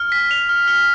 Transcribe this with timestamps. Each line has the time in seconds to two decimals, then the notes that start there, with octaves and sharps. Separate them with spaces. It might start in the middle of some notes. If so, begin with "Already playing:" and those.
Already playing: F6
0.12 B6
0.31 F7
0.49 F6
0.68 F6